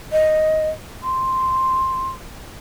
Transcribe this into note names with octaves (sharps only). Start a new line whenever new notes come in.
D#5
C6